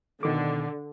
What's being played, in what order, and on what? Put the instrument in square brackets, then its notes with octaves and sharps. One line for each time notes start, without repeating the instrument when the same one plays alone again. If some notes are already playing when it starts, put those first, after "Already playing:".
[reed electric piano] B2 D#3 D6 [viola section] D3